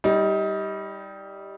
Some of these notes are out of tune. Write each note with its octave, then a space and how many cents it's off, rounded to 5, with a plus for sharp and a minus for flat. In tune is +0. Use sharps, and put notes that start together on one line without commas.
G3 +0 D#4 +30